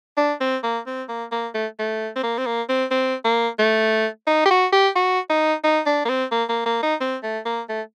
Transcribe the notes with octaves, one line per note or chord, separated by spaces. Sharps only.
D4
C4
A#3
C4
A#3
A#3
A3
A3
C4
A#3
C4
A#3
C4
C4
A#3
A3
D#4
G4
F#4
G4
F#4
D#4
D#4
D4
A#3
C4
A#3
A#3
A#3
D#4
C4
A3
A#3
A3